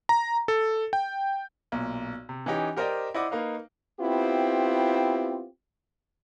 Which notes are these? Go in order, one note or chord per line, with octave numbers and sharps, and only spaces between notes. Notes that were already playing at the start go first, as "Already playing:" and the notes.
A#5
A4
G5
B1 A#2
C3
E3 C#4 D#4 G4
G4 A#4 C5 D5 D#5 G5
E4 C5 D5 D#5 F#5 D6
A#3 D#4 B4 F5
B3 C4 E4 F4 G4